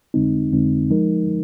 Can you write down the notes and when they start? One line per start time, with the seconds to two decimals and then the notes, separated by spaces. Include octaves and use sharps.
0.14 F2 D3 G#3 C4 D#4
0.52 F2 D3 G#3 C4 D#4
0.90 F3 G#3 D#4 A#4